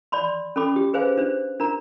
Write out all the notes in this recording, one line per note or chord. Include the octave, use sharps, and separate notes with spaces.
D5 G#5 B5 C6
C#4 A4 B5 D6
G4
G#4 B4 C5 F5 G#5
D4 C5
D4 A#4 A#5